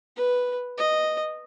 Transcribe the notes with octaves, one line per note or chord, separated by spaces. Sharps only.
B4
D#5